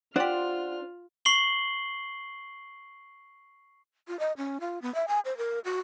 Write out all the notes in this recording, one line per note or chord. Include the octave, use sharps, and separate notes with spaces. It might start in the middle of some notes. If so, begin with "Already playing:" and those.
D4 F4 G4 C5 D5 F#5 F6
C#6 C7 F#7 G7
F4
D#5
C#4
F4
B3
E5
G#5
C5
A#4
F#4